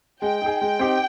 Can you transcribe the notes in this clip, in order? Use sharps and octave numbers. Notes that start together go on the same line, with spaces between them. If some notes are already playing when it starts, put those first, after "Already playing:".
G#3 G5
D#4 G#4
G#3 G5
C4 D#4 G4